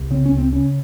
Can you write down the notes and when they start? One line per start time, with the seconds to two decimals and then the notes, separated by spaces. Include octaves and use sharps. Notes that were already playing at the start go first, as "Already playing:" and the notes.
Already playing: C2
0.11 C#3 C4
0.26 C#4
0.32 C#2
0.38 C4
0.52 C#3 C#4